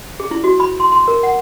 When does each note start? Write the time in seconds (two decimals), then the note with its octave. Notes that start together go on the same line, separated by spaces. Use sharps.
0.20 G#4
0.31 E4
0.44 F#4
0.60 B5
0.80 C6
0.92 C6
1.08 A#4
1.23 F#5